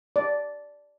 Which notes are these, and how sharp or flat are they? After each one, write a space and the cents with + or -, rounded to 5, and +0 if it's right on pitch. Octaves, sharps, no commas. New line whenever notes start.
D5 -5